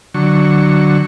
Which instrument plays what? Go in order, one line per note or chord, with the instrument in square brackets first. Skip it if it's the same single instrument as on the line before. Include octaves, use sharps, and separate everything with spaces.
[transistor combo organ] D3 F#3 C#6